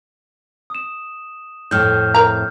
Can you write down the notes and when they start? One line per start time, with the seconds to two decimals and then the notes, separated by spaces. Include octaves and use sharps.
0.70 D#6 E7
1.71 F2 A2 F6 G6
2.14 A#4 A#5